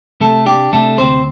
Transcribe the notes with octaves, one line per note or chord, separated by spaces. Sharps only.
C3 A3 A4
D4 G4
C3 A3 A4
D2 C4 C5